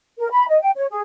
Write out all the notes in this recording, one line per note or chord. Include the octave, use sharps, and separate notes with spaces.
A#4
B5
D#5
G5
C#5
G#4